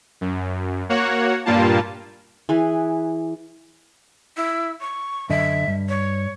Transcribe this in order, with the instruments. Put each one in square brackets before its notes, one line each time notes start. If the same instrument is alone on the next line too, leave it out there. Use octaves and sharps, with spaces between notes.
[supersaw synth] F#2
A#3 F#4 C#5 F#5
G2 A#2 G3 A#3 F4 A5
[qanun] E3 G#4 B4
[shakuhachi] E4
C#6
[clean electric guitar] F#2 D3 D#5 [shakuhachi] E5
[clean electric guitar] G2
[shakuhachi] C#5